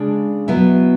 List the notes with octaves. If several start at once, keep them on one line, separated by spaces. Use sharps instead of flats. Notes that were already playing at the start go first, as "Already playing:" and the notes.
Already playing: C#3 G#3 D4
B2 F#3 B3 E4